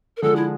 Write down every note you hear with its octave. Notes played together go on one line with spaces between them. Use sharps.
A#4
D3 F3 G#3 A4
E4